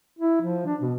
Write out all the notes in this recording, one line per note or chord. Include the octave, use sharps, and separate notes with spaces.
E4
F3
D4
B2